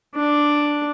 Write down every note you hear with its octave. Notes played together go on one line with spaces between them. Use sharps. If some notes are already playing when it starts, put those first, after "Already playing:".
D4